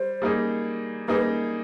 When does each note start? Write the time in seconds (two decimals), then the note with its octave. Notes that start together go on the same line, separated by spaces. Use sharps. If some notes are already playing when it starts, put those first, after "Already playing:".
Already playing: G3 C5
0.22 G3 A#3 D#4 G#4
1.08 G3 A#3 D#4 G#4 B4